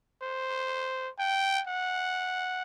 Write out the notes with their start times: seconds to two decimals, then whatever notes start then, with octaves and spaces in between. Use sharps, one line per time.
0.22 C5
1.19 G5
1.67 F#5